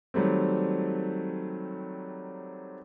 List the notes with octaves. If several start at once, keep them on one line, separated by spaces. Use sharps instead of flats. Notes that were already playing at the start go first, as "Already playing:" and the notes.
D#3 F#3 G3 A3 C4